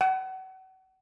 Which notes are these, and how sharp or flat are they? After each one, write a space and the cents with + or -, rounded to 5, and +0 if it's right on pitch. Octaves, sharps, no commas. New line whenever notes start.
F#5 +35